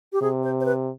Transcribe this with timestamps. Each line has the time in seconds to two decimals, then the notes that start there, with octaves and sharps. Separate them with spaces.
0.13 G4
0.22 C3 G#4
0.43 C5
0.60 C5
0.65 B4